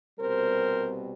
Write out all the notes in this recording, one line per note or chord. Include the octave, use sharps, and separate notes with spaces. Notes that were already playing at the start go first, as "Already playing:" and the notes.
C2 B2 G3 C4 A#4 C5